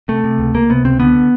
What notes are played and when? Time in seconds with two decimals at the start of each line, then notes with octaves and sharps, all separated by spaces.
0.08 C3 A3
0.24 C3
0.39 C#2
0.54 C#2 A#3
0.70 C3 B3
0.85 C#2 C4
1.00 D3 B3